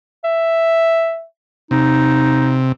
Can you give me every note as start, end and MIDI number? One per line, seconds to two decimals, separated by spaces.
0.24 1.24 76
1.71 2.72 48
1.71 2.58 63